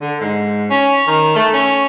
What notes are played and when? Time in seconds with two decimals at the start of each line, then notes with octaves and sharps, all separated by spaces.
0.01 D3
0.21 G#2
0.70 C#4
1.07 D#3
1.36 A3
1.53 C#4